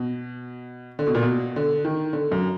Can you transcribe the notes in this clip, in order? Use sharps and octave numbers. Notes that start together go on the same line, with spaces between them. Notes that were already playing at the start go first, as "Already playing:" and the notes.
Already playing: B2
D3
B2
A#2
B2
D3
D#3
D3
F#2